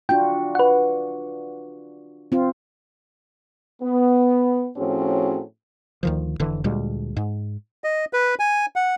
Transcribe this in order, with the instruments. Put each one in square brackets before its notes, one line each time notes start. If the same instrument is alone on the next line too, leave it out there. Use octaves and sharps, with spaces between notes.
[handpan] D4 F4 F#4 [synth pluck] G5
[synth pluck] B4 F#5
[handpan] C4 F4
[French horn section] B3
A2 F3 C4 C#4 F#4 G#4
[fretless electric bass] D2 D#3 F3
F1 D3 E3
D2 A#2 G3 G#3
G#2
[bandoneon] D#5
B4
G#5
F#5